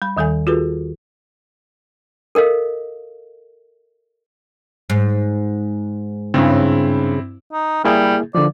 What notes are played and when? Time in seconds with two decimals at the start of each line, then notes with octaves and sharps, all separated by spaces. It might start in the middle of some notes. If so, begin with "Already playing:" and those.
0.02 G3 B5
0.17 D#2 D#3 G3 A4 G#5
0.47 F4 F#4 G#4 A4 B4
2.35 A4 A#4 D#5 F5
4.90 G#2
6.34 G2 C#3 C4 E4
7.53 D#4
7.85 G3 A#3 E4 G#4
8.35 D3 F3 D5